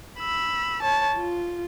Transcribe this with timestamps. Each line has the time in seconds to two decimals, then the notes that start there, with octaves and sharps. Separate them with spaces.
0.19 B5 E6
0.83 C#5 A5
1.17 F4